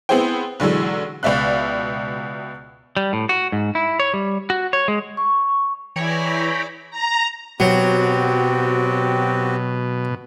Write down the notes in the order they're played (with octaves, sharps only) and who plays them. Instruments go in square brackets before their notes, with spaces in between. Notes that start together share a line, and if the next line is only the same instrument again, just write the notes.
[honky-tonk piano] B3 C4 E4 G#4 C5 G5
B1 D3 E3 F#3 G#3
C#2 B2 D5 E5 F5 F#6
[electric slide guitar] G3
A2
F#4
G#2
E4
C#5
G3
F#4
C#5
G#3
[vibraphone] C#6
[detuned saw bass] E3 [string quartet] E4 G#4 D5 [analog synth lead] C#5 [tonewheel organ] G5 A#5 B5
[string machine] A#5
[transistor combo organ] B2 [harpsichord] F#3 [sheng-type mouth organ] C4 F#4 G4